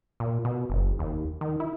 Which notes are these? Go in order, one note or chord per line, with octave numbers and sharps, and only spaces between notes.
A#2
B2
F#1
D#2
D#3
E4